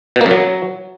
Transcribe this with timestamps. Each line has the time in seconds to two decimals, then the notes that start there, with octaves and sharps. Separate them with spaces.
0.16 B2
0.21 A#3
0.26 F#2
0.31 F#3